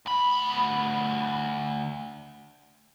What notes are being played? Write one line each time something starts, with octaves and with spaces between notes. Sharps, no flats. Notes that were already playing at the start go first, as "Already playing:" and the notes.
D2 B5